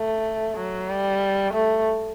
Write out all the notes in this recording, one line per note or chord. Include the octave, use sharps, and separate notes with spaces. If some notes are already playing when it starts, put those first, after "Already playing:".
Already playing: A3
F#3
G3
A3